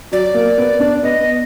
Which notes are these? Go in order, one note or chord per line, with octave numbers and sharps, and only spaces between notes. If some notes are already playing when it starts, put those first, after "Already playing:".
F#3 D5
A#3
B3
D4
B3 D#5